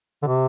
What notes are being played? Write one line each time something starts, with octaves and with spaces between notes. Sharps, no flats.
D3
C3